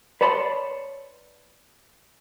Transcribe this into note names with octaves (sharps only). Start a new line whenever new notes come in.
B4 C#5 D5 A5 B5 C6